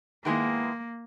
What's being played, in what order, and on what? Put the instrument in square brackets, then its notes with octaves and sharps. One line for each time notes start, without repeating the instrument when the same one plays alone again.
[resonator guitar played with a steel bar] D#3 G#3 B3 E4 G#4 [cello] A#3